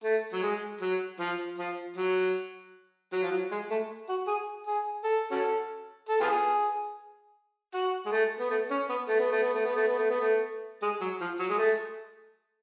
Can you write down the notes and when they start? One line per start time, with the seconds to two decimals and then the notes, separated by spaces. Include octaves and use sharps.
0.04 A3
0.33 F#3
0.43 G#3
0.81 F#3
1.19 F3
1.58 F3
1.96 F#3
3.12 F#3
3.23 F3
3.31 F#3
3.51 G#3
3.71 A3
4.09 F#4
4.27 G#4
4.67 G#4
5.04 A4
5.31 C#4 F#4 A4
6.09 A4
6.20 B3 F4 G#4
7.74 F#4
8.06 G#3
8.12 A3
8.40 B3
8.51 A3
8.71 C#4
8.89 B3
9.08 A3
9.20 B3
9.32 A3
9.42 B3
9.54 A3
9.65 B3
9.77 A3
9.88 B3
9.99 A3
10.10 B3
10.21 A3
10.82 G#3
11.01 F#3
11.21 F3
11.39 F#3
11.50 G#3
11.58 A3